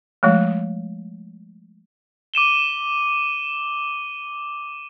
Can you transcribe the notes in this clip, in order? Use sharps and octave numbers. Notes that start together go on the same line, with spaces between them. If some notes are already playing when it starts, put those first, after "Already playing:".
F3 G#3 A3
D6 D#7 E7 G7